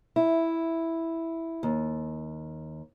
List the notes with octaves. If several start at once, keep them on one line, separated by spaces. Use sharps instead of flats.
E4
D#2